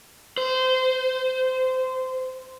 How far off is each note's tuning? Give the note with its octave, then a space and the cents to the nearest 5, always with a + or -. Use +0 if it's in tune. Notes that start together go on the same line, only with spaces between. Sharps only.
C5 -20